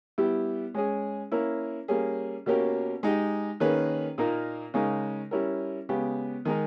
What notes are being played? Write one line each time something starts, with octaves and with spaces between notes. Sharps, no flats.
G3 B3 E4 G4
G#3 C#4 G#4
A#3 C#4 E4 A#4
G3 A#3 C#4 G#4
B2 A#3 C#4 G4 A#4
G#3 D#4 G4
D#3 A#3 C#4 G#4 B4
A#2 A#3 D#4 A#4
C#3 G#3 D#4 A#4
G3 C#4 E4 A#4
C#3 G#3 B3 G4
D#3 G#3 D#4 A#4